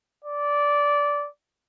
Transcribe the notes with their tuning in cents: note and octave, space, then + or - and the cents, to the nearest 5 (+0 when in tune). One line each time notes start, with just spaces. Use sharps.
D5 -15